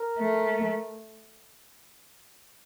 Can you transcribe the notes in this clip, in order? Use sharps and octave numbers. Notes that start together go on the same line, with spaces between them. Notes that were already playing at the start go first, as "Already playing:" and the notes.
Already playing: A#4
A3